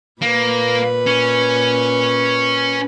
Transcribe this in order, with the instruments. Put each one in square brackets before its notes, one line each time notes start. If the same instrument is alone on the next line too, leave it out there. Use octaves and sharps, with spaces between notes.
[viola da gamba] A#2 B4 [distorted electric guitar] A#3
[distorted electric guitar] C#4